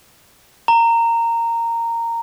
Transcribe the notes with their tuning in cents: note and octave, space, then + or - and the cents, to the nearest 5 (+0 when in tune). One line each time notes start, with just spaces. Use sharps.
A#5 -15